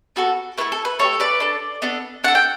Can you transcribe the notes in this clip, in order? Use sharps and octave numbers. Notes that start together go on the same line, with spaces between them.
B3 F#4 A4
A3 E4 A4 B4
A4
B4
A3 E4 G4 A4 C#5
B4 D5
D4 A4
B3 D4 A4
D4 A4 F#5
G5